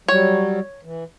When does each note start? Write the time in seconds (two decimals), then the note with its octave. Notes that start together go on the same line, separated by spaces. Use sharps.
0.08 F#3 G3 C#5
0.83 E3